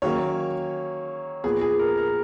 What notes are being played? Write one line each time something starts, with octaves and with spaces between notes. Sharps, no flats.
D#3 F#3 A#3 C#4 C#5
A#2 F3 B3 G#4
G#4
A#4
A#4